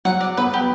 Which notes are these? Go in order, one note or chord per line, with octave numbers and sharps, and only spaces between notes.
F#3 F#5
D5
B3 B4
G4